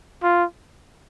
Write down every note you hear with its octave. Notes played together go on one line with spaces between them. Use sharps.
F4